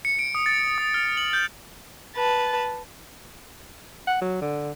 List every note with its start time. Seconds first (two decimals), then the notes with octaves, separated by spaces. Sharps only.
0.05 C#7
0.19 D7
0.35 D#6
0.46 A6
0.78 D#6
0.94 F6
1.17 F#7
1.33 G6
2.16 B4 A5
4.07 F#5
4.21 F#3
4.41 D3